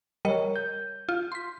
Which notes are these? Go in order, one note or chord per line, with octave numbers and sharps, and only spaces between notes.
G3 A#4 C#5 D#5 C#7
G6
F4
C6 B6